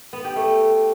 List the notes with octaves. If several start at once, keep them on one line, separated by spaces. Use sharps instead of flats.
B3
G4
A3